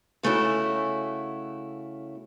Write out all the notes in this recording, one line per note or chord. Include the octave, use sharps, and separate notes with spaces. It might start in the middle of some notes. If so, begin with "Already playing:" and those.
C#3 A3 C#4 E4 F#4